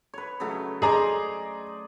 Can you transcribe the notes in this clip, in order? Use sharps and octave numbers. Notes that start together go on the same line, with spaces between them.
B4 C#5
C#3 F#3 A3
G#4 C5 D5 D#5 A#5